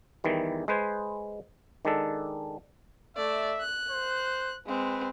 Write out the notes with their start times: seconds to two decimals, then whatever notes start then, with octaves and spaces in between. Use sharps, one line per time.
0.24 E2 D#3 E3 G3
0.68 G#3 B4 C5 G#5
1.85 D#3 G#3 D4 A4
3.17 A3 D5 E5
3.60 F#6
3.91 C5
4.67 G#3 C4 B4